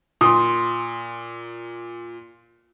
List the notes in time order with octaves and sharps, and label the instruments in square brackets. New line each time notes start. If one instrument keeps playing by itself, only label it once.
[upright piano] A#2 [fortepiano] C6 D#6